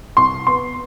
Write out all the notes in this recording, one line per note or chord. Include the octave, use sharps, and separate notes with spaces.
C2 C6
B3 C6